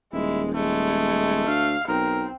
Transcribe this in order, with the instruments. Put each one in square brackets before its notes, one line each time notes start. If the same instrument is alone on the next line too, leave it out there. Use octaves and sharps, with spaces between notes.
[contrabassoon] D#1 [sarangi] G#3 [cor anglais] E4
[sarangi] G#3 [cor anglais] A3
[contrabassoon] D2 [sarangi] F5
[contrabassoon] B1 [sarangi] C4 [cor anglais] A#4